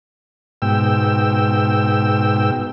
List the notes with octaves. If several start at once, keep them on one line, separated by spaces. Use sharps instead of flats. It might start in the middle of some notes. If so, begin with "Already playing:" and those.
G#2 B2 G5 E6